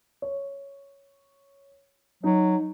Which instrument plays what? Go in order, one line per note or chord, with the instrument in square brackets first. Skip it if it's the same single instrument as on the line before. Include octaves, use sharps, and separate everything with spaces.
[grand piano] C#5
[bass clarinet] F#3 [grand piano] D#4